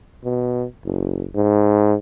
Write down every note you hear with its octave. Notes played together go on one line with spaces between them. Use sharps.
B2
F#1
G#2